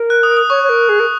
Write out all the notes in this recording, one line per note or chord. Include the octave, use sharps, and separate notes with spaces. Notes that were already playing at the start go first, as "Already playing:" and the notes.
Already playing: A#4
F#6
D#6
D#6
C#5 C#6
C#5
A#4
G#4
A#4